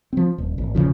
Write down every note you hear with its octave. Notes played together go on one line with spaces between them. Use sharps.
F3 C4
D#1
G#1
E1 D#2 C#3 F3